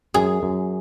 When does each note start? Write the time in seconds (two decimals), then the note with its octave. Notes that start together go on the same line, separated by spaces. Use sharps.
0.14 F#2 G#4
0.43 F#2